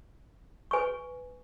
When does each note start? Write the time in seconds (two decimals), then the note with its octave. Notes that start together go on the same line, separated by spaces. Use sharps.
0.71 B4 G#5 C#6